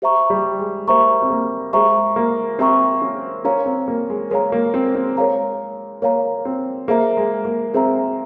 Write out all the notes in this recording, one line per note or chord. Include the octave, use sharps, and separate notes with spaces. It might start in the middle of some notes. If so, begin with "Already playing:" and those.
G4 C5 E5 A#5 C#6
G3
G#3
A#3 G4 C5 E5 A#5 C#6
C4
A#3
G#3 G4 C5 E5 A#5 C#6
A#3
C4 G4 C5 E5 A#5 C#6
C#4
C#4 A#4 C#5 F5 A#5
C4
A#3
G#3
G#3 A#4 C#5 F5 A#5
A#3
C4
C4
G#3 A#4 C#5 F5 A#5
A#3 A#4 C#5 F5 A#5
C4
A#3 G#4 C5 E5 A#5
G#3
A#3
C4 G#4 C5 E5 A#5